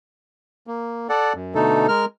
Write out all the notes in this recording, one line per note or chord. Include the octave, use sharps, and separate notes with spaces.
A#3
A4 D5 F#5
F#2
B2 D3 A3 D#4 A4
G#3 A#4 F6